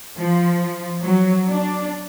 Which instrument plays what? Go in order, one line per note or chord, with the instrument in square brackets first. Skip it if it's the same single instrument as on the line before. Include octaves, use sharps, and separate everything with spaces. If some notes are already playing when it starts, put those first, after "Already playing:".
[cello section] F3
F#3
D4